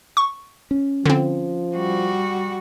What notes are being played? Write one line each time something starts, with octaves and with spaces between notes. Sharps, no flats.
C#6
C#4
D3 F3 C4
G3 F#4